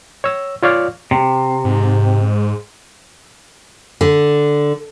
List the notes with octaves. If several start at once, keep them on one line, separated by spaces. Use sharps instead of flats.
C#5 E6
F4 C#5 D5 F5
C3
G#2
D3